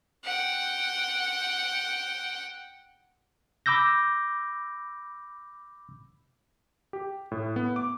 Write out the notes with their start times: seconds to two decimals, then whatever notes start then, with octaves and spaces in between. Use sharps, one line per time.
0.25 F#5 G5
3.66 B5 D6 E6 G6 A#6
6.93 G4
7.32 A2
7.56 B3
7.76 D6